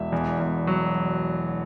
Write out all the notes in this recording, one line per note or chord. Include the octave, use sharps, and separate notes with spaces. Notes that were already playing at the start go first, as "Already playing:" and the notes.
Already playing: E1 E5
E2
E2
F#3